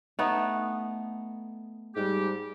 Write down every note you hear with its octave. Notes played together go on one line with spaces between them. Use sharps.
A3 B3 D#4
G#2 G3 G4